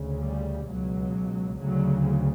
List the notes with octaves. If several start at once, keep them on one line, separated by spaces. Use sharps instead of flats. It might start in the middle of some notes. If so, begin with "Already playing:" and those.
Already playing: D2 C#3
G3
C#2 B2 F#3
D2 C#3 F#3